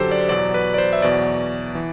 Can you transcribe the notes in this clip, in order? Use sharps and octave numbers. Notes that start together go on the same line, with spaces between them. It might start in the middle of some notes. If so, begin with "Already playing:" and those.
Already playing: F#2 D3 F#3 G4 A4 C5
D5
E2 B2 F#3 D5
B4
D5
C5
E5
E2 B2 F#3 D5
E3